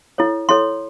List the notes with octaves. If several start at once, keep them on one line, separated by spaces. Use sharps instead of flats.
E4 A4 C#5
E4 A4 C#5 C6